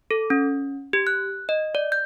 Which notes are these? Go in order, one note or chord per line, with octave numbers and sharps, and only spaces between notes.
A4
C#4
G4
F#6
D#5
D5
G6